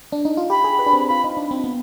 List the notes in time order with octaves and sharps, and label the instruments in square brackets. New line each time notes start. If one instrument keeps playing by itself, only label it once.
[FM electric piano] D4
D#4
F4
[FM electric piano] G4 [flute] B5
[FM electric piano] G#4
B4
D4
C4
[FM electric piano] F4 [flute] B5
[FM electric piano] D#4
D4
C4
B3